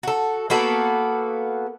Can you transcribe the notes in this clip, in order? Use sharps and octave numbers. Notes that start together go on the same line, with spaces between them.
F#4 A4
A#3 B3 F#4 A4